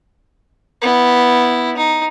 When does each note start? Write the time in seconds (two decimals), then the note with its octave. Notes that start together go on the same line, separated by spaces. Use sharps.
0.82 B3 E4
1.77 D#4